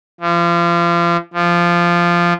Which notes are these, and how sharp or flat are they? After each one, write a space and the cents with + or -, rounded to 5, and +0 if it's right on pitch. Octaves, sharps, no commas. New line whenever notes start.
F3 -35
F3 -15